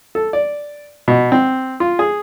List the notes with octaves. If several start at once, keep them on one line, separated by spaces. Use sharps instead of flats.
A4
D5
B2
C4
F4
G#4